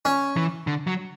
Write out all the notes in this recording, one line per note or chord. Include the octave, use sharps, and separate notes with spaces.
C#4
E3
D3
F#3